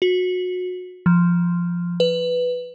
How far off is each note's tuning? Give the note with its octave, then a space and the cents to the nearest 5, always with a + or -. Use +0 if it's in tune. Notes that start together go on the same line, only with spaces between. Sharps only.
F#4 -25
F3 -5
B4 +5